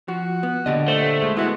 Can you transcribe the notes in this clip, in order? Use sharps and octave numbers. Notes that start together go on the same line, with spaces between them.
F3 F#4
B3
A#2 D3 G4 D#5
A3 C5
G#3
E3 B3 F#4